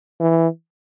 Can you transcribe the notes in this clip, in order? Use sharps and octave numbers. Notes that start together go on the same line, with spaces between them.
E3